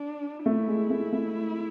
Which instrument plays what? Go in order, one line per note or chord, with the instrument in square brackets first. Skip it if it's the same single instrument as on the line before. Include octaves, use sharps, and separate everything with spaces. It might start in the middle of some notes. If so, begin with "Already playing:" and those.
Already playing: [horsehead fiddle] D4
[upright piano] A3 [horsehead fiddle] E4
[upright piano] G#3
A3
A3